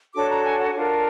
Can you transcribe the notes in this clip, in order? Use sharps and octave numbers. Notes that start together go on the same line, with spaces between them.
D4 F#4 A4 C#5 D6
A#5
G#5
F#5
D4 F4 A#4